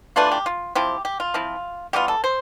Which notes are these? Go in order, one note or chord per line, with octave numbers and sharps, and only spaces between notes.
E3 A3 D4 F4 B4
G4
F4
F3 C4 E4 G4
G4
F4
F3 C4 E4
E3 G3 B3 F4 G4
A4
C5